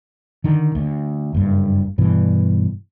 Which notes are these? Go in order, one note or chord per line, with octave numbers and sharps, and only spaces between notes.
D3 D#3
D2
F#1 G2
G2 B2 E3